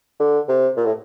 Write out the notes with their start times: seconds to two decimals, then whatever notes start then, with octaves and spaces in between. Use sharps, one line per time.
0.20 D3
0.49 C3
0.77 A#2
0.85 A2